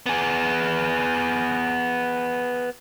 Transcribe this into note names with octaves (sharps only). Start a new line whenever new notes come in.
B3 G#4